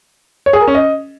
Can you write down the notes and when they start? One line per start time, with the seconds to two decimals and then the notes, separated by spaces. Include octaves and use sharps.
0.46 C#5
0.53 G#4
0.60 A#4
0.68 C#4
0.75 D#5